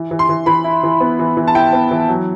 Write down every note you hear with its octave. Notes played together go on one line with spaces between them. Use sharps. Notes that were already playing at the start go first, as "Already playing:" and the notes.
Already playing: E3
E3
C6
E3
E3 B5
E4
E3
B3
E3
E3
A5
E4 G5
B3
E3
F#3